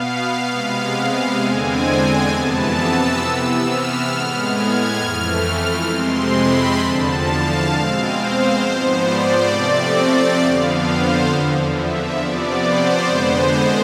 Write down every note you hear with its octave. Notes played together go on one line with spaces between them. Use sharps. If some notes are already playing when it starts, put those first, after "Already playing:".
Already playing: B2 B3 F5
C3 G#3 B3 F5
E2 D3 G#3 C4 G#5
F2 C3 E3 B3 A5
E6
C3 E3 B3
F6
A2 G#3 B3
G#6
F2 E3 A3 F6
F2 C3 G#3 C4 C6
B5
E2 D3 F3 A5
F5
B2 G#3 C4
C5
G#2 F3 B3
D5
C3 F3 A3 C4
F2 D3 F3 B3 F5
C5
E2 D3 F3
E5
C3 F3 B3 D5
C5
F2 D3 G#3 B3 C5